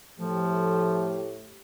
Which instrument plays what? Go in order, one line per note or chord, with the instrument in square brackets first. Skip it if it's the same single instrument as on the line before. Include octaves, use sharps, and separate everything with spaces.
[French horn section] A2 A3 G4 [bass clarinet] F3